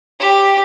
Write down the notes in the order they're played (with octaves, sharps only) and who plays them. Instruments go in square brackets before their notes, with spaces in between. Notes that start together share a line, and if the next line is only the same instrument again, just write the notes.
[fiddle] G4